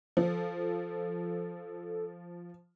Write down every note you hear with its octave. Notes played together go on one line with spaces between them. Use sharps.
F3 A4